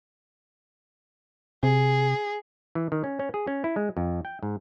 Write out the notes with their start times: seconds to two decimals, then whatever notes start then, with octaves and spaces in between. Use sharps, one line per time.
1.63 C3 G#4
2.75 E3
2.92 D#3
3.04 C#4
3.19 C#4
3.34 G#4
3.47 C#4
3.64 E4
3.76 G#3
3.97 F2
4.25 G5
4.43 G#2